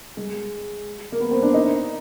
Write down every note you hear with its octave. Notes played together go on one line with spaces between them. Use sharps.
G#3
A#3
B3
C4
D4
D#4